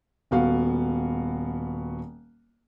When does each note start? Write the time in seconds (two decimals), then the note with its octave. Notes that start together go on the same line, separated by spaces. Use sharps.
0.31 D#1 B3 F#4 F5